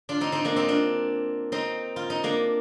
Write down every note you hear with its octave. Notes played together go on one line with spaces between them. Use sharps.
D4 F4
C4 D#4
C4 D#4
A#3 D4
C4 D#4
D4 F4
C4 D#4
F4
D#4
A#3 D4